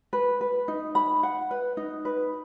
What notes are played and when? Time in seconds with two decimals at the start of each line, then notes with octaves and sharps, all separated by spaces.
0.13 B4
0.41 B4
0.68 D#4
0.95 B5
1.23 F#5
1.51 B4
1.77 D#4
2.05 B4